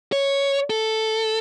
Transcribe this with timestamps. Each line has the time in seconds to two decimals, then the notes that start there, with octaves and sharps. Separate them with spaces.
0.12 C#5
0.70 A4